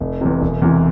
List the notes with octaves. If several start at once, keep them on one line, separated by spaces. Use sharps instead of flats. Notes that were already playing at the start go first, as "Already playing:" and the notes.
F1
E2 C3
E1
E2 C3 E3